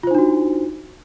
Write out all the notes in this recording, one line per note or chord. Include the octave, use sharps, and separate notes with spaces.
D4 D#4 F4 F#4 C5